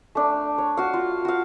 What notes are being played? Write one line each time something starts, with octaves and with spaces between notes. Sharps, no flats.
A3 D4
C#5
F#4 F5
F4
F#4 F5